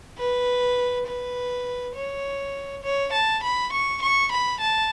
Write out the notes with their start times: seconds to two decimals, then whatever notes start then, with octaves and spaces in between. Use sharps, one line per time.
0.18 B4
1.07 B4
1.95 C#5
2.83 C#5
3.12 A5
3.43 B5
3.72 C#6
4.02 C#6
4.32 B5
4.60 A5